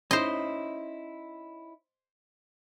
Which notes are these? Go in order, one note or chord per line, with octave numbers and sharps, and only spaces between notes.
C#4 D#4 E4 C5 D#5